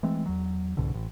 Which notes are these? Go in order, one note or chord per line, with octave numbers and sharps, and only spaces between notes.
E3 G#3 A3 C4
E2 F#3
C2 G#2 B2 D3
A1